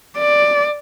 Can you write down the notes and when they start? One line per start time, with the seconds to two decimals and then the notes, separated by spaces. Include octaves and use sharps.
0.17 D5